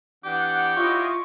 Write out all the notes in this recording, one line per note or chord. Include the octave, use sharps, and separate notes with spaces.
E3 B3 D4 G4 F#5
E4 F4 C#5 D#5 F5 C6 C#6